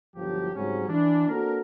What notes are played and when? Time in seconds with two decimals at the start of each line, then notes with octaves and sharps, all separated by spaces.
0.16 G1 D#2 F3 F#3 G4
0.54 G#2 C#3 F#3 G3 C4 C#4
0.89 E3 D4
1.28 A#3 C4 D4 F#4 A4 A#4